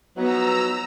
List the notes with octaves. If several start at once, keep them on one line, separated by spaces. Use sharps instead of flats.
F3 F#3 B3 D#4 B4 A#5 E6